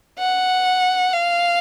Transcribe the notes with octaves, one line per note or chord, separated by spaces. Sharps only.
F#5
F5